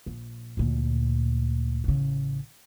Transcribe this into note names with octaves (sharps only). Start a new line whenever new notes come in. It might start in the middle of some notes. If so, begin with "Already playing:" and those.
A#1
D2 A#2
A1 C#3